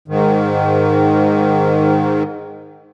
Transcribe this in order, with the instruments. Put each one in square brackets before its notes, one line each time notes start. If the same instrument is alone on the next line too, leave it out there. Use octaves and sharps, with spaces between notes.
[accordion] G#2 D#3